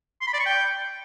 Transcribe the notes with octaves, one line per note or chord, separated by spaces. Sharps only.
C6
B5
D5
C#6
G5